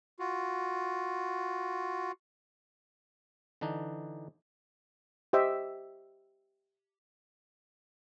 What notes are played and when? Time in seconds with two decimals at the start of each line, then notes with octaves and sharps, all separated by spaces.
0.19 F4 F#4
3.61 D3 E3 D4 D#4
5.33 G4 C5 D#5 E5 G5